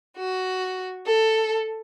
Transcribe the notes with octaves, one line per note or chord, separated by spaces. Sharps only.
F#4
A4